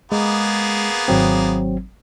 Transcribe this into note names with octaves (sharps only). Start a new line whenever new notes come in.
G#3 A#3 B3 G#4
G#1 F#3 C4